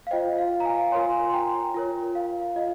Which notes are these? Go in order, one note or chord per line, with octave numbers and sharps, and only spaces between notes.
F5
F4 C5 D#5 G5
F5
A#5
F5 G#5
F4 A#4 C#5 G#5 C6
C6
G5 A#5
F4 A#4 C#5
F5
F4 D#5